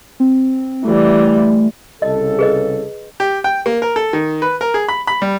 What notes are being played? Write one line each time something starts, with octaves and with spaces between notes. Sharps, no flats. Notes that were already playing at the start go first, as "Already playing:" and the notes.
C4
E3 G3 A3
C2 C#3 A4 D#5
G#4 B4 D#5
G4
G5
A#3
A#4
A4
D#3
B4
A#4
G#4
B5
B5
G3